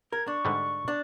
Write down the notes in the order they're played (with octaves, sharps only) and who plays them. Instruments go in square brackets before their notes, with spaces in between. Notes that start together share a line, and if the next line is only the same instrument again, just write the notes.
[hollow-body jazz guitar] A#4 [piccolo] G#6
[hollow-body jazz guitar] D4 [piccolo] C#6
[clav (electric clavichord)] G#2 D3 G3
[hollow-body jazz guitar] D4